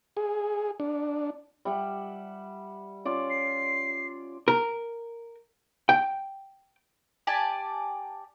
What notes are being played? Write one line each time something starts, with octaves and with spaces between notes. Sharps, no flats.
G#4
D4
G3 E5 F#5
C#4 F4 D5
C7
A#4
G5
G4 D5 G#5 A5